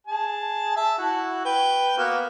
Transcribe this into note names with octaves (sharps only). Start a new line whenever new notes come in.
G#4 A5
E5 A5
E4 F#4
B4 G5
A#3 B3 F#4